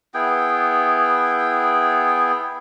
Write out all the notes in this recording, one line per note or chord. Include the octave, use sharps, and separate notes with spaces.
B3 E4 G#4 G5